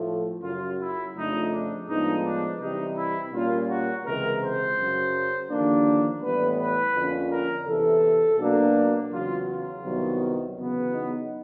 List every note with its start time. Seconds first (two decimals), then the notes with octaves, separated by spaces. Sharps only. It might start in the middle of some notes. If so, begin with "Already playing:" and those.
Already playing: A2 F3 A3
0.42 F#2 C#3 F#3 F4
0.79 E4
1.15 F2 C#3 F3 A3 D4 D#4
1.51 D4
1.87 A2 F3 G#3 B3 D4 D#4
2.23 D4
2.59 C3 E3 G3 C4 D#4
2.96 E4
3.32 A#2 G3 A#3 C#4 F4
3.68 F#4
4.05 C#2 C3 E3 G#3 A#4
4.41 C5
4.77 F#2 C#3 F#3
5.50 D#2 D3 F3 A#3 D4
6.22 A2 E3 G3 B3 B4
6.58 B4
6.94 F2 D3 F3 A#3 C#4
7.31 A#4
7.66 E2 C3 E3 A4
8.39 B2 F#3 A#3 D4
8.75 A#4
9.11 E2 C#3 F#3 F4
9.48 F4
9.83 C2 C3 D#3 F#3 B3
10.56 E2 C#3 F#3 B3
10.92 D#4